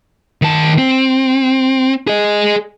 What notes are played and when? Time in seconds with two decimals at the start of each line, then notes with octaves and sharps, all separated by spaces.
0.42 D#3 A5
0.78 C4
2.08 G#4 D#5